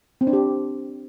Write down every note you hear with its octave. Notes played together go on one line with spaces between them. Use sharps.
C4
D4
G4